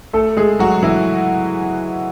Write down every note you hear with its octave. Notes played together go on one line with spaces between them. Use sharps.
A3 A4
G#3 G#4
F#3 F#4
E3 E4